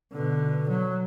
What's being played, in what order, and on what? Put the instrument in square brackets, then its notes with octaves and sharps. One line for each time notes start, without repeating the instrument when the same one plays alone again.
[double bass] B2 D3
F#3